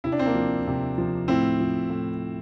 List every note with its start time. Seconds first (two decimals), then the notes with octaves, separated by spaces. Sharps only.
0.04 C3 E4
0.12 D4
0.19 C4
0.26 A#3 D4
0.35 F3
0.67 C3
0.98 F3
1.28 A2 C4 E4
1.60 F3
1.90 A2